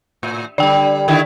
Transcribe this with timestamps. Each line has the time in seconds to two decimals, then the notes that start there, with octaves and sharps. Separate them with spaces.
0.23 A2
0.58 D3 G3 D5 G5
1.08 D3 D#3 E4